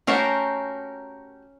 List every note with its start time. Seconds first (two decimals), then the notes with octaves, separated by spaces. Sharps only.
0.07 A3 C#4 F#4 G4 A#4 C5